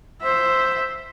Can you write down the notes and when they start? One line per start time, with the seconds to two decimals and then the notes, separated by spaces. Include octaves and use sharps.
0.22 C5 E5